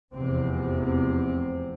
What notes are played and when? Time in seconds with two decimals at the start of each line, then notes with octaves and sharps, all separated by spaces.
0.14 F1 E2 C3 C4
0.82 C4